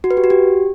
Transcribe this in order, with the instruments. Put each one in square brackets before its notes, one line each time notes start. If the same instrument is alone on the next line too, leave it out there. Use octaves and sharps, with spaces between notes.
[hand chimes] F#4
B4
G4
F#4
G4